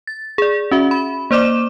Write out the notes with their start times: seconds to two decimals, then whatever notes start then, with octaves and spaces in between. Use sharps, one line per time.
0.07 A6
0.38 G#4 D5
0.71 C#4 F#4 E5
0.91 B5
1.31 A#3 C5 D5 D6 E7